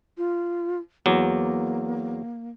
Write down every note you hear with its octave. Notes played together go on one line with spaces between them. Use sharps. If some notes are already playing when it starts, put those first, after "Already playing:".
F4
E2 F#3 A#3